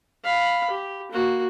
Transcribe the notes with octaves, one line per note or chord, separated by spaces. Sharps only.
F5 B5
G4
A#3 F#4